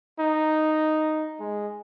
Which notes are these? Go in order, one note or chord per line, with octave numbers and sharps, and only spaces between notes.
D#4
G#3